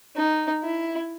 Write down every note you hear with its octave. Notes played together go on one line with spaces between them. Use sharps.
D#4
E4